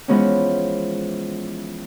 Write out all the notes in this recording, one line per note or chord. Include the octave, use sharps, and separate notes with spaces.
E3 F3 G#3 B3 C#4